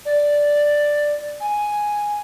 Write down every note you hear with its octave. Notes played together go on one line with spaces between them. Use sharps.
D5
G#5